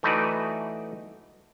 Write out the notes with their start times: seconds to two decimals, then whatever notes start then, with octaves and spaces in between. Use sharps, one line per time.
0.03 E3 A3 D#4 F#4 B4 D5